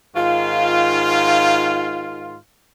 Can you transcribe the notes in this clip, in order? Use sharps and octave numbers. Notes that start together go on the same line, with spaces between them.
G#2 D#3 F4